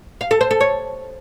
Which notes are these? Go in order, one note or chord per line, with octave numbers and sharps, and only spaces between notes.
F5
A4
C5
A4
C#5